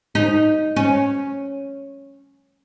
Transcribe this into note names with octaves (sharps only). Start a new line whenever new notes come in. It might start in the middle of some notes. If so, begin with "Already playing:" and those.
D#4
C#4